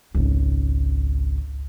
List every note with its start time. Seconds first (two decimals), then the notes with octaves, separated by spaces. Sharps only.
0.15 G#1 C#2